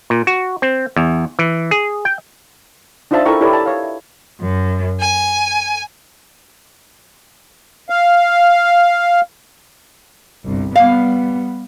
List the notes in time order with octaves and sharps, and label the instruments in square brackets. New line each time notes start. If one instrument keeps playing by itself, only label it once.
[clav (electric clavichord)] A#2
F#4
C4
E2
E3
G#4
G5
[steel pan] D4 D#4 F4 C5 E5 A5
E4 A4 A#4 G5 C#6
E4 G4 A4 B4 C#5 D5
A5
C#5 F5
E5
[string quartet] F#2
G#5
[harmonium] F5
[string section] G1 C2
[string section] G3 B3 [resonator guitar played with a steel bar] F5